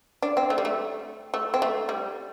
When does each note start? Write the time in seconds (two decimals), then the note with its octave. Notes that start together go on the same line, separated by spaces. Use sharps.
0.22 D4
0.37 C4
0.50 A3
0.58 G3
0.65 A3
1.34 A3
1.54 C4
1.62 A3
1.89 G3